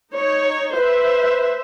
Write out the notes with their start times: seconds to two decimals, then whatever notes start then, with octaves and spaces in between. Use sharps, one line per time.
0.12 D#4 C#5
0.75 B4 C5 E5